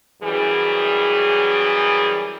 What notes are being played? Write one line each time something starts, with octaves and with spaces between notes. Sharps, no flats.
F#2 E3 G3 G#4